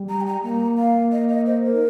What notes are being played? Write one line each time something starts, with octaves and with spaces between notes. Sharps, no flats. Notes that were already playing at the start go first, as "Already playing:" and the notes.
Already playing: G3
A#5
G5
A#5
A#3 A#5
F5
D#5
D#5
C5
A#4
D#4